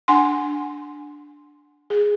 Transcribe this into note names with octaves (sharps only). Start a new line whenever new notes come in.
D4 F#5 G#5 C6
G#4